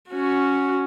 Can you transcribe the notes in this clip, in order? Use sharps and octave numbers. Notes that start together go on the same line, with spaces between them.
C#4 F#4